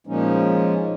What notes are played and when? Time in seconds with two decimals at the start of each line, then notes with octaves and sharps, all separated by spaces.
0.07 A#2 F3 G#3 A#3 C#4 D#4